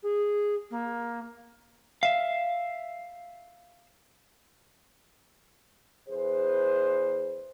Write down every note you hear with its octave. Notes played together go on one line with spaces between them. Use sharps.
G#4
A#3
E5 F5
E2 G#4 B4 C5